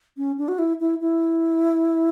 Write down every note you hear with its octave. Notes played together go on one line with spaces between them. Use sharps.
C#4
D4
F#4
E4
E4
E4